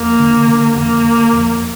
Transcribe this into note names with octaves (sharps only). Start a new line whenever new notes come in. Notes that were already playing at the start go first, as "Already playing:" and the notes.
Already playing: F2 A#3
D3
D3
F2 A#3
D3
F2